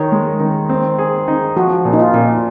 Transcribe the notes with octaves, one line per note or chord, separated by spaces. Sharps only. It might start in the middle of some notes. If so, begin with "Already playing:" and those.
Already playing: D#3 D#4 C#5
G#3
D#3
C4
G#4
D#4
F3 F#4
A#2
D#4
F4
A#2